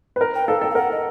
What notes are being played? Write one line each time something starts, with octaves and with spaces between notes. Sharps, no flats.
B4
A#4
G5
A4 F5
A4 G5
F5
A#4 F#5
D#5